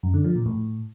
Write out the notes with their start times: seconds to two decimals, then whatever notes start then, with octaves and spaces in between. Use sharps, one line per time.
0.03 F#2
0.14 D3
0.25 F3
0.35 A#2
0.46 A2